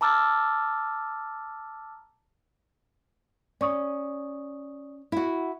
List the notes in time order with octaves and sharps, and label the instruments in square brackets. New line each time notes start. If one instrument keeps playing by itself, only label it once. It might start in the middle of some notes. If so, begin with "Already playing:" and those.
[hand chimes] A5 A#5 D6 E6 F6 A6
[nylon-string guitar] C#4 [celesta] D5 C#6 D#6
[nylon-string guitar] E4 F#4